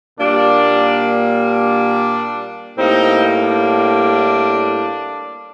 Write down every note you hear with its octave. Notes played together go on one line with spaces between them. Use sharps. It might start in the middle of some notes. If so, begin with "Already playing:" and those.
A#2 G3 A#3 D4
D4
A2 G3 A#3 C4 D#4
D4